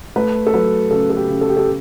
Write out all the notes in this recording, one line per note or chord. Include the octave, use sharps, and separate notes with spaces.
A3 B4
A4
F#3 B4
C#3 A4
A4
G4
C#3
A4
G4
A4